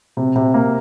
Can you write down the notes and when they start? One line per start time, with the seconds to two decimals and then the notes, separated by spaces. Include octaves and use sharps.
0.17 C3
0.36 C3
0.54 A#3